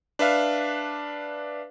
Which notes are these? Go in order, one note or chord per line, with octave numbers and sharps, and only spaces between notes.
D4 B4 E5 F5